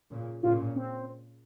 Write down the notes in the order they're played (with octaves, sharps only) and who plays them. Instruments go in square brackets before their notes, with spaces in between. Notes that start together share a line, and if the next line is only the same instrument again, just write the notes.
[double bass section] A#2 C#3
[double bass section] A#2 C#3 [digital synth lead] F4
[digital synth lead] C4